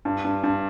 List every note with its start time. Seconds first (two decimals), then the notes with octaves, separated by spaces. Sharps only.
0.05 G2
0.25 G2
0.43 G2